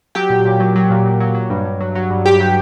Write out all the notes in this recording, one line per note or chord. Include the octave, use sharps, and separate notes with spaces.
F#3 G4 G5
A#2
A#2
F#3
F#3
A#2
A#2
F#3
F#3
G2
G2
F#3
F#3
G2
G2 G4 G5
F#3